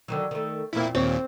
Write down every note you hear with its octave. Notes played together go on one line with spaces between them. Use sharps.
D3 D#3 F#3
D#3 A3
E2 A#2 A#3 C4 E4
D#2 A#2 C4 C#5